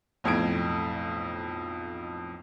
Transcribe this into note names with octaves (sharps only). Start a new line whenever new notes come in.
B1 F2 A2 G#6 D7